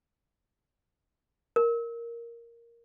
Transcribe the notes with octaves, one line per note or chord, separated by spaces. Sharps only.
A#4